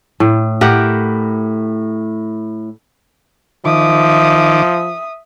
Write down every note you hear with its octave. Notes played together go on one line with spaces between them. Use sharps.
A2
A2 G4 A#4 F#5
D#3 F3 E5 D6 D#6